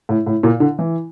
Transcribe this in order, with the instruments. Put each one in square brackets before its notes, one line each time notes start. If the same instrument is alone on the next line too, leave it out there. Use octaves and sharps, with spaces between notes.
[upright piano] A2
A2
A#2
D3
E3